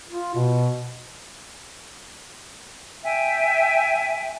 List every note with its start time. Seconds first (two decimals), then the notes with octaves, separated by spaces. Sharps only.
0.09 F4
0.34 B2
3.04 E5 G5 G#5